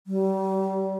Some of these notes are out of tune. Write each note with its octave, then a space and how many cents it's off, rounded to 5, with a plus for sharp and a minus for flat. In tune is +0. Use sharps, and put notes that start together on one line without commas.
G3 -35